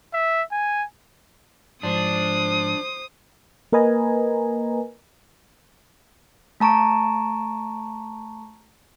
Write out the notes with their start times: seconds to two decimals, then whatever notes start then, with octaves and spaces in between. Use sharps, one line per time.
0.14 E5
0.52 G#5
1.83 G#2 F3 D4 C5 D#6
3.72 A#3 A#4 B4 D#5 G#5 A#5
6.60 A3 A5 A#5 C#6 D7